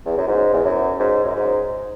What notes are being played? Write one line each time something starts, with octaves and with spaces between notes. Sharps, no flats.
E2
F#2
G#2
E2
F#2
G#2
F#2
G#2